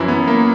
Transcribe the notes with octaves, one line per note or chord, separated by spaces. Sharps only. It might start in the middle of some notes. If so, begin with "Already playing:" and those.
Already playing: F#2 E3 E4
B3
A#3